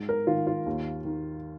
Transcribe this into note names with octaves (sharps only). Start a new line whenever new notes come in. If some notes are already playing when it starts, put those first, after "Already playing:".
Already playing: G#2
A#4
D#3 F4
F4
D#2
D#3